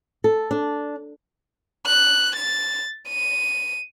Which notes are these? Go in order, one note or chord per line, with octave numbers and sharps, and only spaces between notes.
A4
D4
F#6
A6
D#7